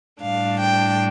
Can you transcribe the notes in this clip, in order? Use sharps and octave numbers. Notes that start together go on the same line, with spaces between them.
A2 G3 D4 F5
G5